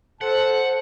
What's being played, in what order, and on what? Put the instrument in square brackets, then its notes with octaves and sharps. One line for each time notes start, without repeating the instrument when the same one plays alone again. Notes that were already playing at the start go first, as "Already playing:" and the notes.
[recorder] A4 [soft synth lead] C5 [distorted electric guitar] F#5 [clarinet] A5